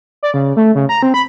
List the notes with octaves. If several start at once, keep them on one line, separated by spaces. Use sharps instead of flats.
D5
C#3
A3
C#3
A#5
C4
B5